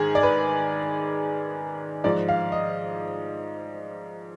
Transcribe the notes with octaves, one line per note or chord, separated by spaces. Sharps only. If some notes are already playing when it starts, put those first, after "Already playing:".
Already playing: G#2 D#3 G#4
D5
B4
G#2 F3 D5
F5
D#5